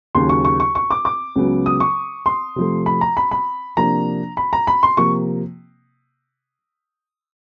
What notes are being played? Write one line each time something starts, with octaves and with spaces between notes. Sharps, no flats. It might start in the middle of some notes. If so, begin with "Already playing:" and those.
D#2 C#3 F#3 C6
C#6
C#6
C#6
C#6
D6
D6
C#2 C#3 F#3 B3
D#6
C#6
C6
C3 F3 A3
B5
A#5
B5
B5
C3 F3 A#3 D4 A#5
B5
A#5
B5
C6
C3 F3 A#3 C#6